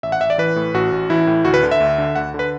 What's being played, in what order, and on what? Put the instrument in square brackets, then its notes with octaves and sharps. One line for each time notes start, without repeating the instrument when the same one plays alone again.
[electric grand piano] A1 E5
F#5
A1 E5
D5
E3 B4
A2
A1 F#4
A1
E3 E4
A2
D2 F#4
B4
D3
E5
D2
D3
D2 F#5
D3
B4